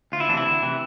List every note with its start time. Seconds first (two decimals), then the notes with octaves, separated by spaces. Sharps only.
0.12 D2 F4
0.20 E4
0.29 E3 D4
0.33 C3 E4
0.46 D2
0.63 C3 E3